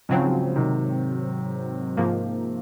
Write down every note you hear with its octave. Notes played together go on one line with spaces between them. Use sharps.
G#2 C#3 F3 F#3 C4
C3 D#3
G#2 F3 A#3